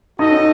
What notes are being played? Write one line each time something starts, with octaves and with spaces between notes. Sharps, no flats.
D#4 F#4 A4 D#5
C#4
D#4